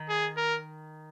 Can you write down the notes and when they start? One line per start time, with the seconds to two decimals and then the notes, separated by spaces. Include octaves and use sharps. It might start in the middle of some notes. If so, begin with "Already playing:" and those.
Already playing: D#3
0.09 G#4
0.37 A#4